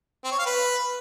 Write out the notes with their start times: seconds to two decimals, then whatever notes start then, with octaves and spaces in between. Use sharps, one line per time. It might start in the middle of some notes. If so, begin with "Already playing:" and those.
0.24 C4
0.32 C#5
0.39 F5
0.46 B4